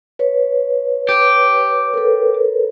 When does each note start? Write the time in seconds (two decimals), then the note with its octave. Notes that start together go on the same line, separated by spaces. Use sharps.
0.19 B4 C#5
1.09 G4
1.94 A#4
1.97 A4 B4